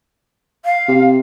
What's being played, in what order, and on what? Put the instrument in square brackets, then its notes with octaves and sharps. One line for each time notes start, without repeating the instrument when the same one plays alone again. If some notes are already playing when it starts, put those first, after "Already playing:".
[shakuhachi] F5
[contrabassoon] C3